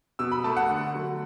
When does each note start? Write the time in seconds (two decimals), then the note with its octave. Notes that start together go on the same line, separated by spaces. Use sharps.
0.19 B2 E6
0.32 B5
0.44 A3 A5
0.57 F#5
0.70 D3
0.94 F#3 A3